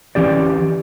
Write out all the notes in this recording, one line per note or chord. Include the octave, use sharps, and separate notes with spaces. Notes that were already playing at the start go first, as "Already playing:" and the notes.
E3 C#4 G4 D5